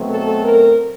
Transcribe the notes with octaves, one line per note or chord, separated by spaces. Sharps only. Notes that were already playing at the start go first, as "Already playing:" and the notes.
Already playing: B2 F#3 A3 C4
A4
A#4